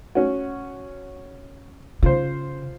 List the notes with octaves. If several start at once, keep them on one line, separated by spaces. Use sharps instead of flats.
C#4 F#4
C#3 F4 C5